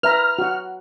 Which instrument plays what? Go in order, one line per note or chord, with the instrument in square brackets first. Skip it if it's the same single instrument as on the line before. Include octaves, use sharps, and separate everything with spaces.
[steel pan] B4 E5 A#5 [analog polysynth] F6
[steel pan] F#4 F#5